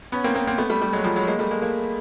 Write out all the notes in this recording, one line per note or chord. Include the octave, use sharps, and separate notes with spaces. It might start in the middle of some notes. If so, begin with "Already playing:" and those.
B3 C#4
A#3 C4
A#3 C4
A#3 C4
A3 B3
G3 A3
G3 A3
F#3 G#3
F3 G3
F#3 G#3
G#3 A#3
G3 A3
G#3 A#3
G#3 A#3